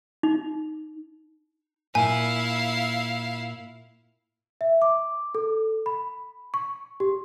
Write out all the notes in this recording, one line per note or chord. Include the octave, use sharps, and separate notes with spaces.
D#4
A#2 E4 F5 G#5
E5
D6
A4
B5
C#6
G4